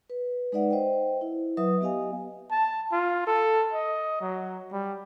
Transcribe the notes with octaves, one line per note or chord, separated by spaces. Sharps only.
B4
G#3 D#4 B4 D5 E5 F#5
C5 D#5 E5 G5
E4
F#3 B4 E5 D#6
B3 G4 D#5 F5 G#5
A5
F4
A4
D#5
F#3
G3